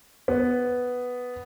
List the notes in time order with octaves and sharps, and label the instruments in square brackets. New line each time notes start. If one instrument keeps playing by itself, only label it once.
[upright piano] B3